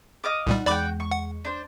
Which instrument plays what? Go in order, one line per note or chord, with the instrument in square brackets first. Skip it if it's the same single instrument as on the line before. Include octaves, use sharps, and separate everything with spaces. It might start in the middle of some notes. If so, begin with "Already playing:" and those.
[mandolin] D#5 F5 D6
[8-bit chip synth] C2 A#2 G3 [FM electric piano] D#4 F#5
[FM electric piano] E2 G#3 [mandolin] F#4 F#5 G5 [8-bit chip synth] D5 B5 D6
[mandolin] C#6
[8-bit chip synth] F#5
[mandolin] D4 C5